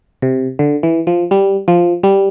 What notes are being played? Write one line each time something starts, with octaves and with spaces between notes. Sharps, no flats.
C3
D3
E3
F3
G3
F3
G3